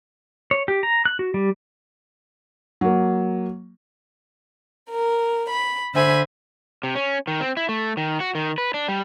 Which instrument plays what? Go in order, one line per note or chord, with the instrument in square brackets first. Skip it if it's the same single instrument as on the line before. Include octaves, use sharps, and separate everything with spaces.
[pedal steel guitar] C#5
G4
A#5
F#6
F#4
G3
[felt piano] F#3 A#3
[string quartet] A#4
B5
D3 C5 E5 G#5 B5
[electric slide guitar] C3
C#4
D#3
C4
E4
A3
D#3
F#4
D#3
B4
D4
G3